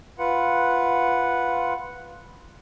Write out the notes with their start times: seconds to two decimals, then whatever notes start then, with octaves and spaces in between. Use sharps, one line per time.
0.18 F4 B4 F#5